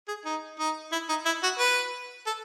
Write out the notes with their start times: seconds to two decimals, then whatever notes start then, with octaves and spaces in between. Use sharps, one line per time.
0.08 G#4
0.25 D#4
0.59 D#4
0.92 E4
1.09 D#4
1.26 E4
1.43 F#4
1.59 B4
2.26 A4